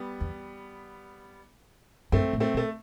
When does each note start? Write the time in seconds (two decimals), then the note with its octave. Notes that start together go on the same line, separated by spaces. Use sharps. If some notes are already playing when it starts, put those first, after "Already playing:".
Already playing: G3 B3
0.21 E2
2.12 G2 A3 C4
2.33 A2
2.40 A3 C4
2.54 B2
2.57 A3